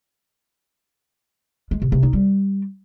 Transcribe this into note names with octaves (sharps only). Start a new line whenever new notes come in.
G#3
C3
C3
D#4
G3